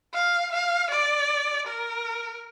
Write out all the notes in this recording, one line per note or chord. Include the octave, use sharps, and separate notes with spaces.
F5
F5
D5
A#4